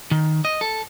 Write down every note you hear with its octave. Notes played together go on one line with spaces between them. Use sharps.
D#3
D#5
A4